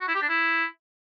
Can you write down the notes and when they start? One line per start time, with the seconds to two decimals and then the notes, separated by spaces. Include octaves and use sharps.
0.01 F#4
0.08 E4
0.15 G4
0.22 D4
0.29 E4